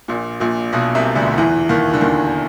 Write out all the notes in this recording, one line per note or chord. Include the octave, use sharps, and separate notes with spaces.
A#1 A#2
A#1 A#2
B1 B2
C2 C3
D2 D3
E2 E3
D#2 D#3
D3
D#2 D#3